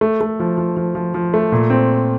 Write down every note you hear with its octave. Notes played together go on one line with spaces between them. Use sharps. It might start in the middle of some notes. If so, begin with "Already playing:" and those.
A3
A3
F3
F3
F3
F3
F3
A3
A#2
C4